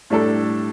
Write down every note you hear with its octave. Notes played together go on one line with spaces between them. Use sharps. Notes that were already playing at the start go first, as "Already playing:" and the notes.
A2 G3 D4 A4